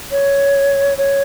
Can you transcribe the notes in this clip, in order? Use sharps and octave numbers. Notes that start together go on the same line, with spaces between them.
C#5
C#5